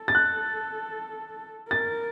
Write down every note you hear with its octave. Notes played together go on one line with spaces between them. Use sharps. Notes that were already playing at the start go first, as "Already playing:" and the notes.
Already playing: A4
A6
F#6
A#4 A6